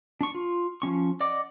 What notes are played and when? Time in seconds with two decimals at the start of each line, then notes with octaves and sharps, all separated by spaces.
0.21 D4 C#6
0.35 F4
0.82 F3 C#4 C#6
1.21 D5 D#5 F#5 D6